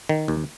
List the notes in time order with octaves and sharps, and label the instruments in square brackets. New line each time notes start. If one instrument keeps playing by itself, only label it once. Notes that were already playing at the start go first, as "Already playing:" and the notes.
[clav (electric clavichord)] D#3
D#2